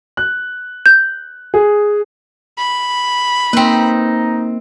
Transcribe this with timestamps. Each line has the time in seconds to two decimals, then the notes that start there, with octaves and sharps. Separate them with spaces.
0.17 F#6
0.86 G6
1.54 G#4
2.58 B5
3.53 A#3 C4 D#4 B4